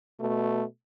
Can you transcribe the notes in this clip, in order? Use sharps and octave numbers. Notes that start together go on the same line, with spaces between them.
B2 A3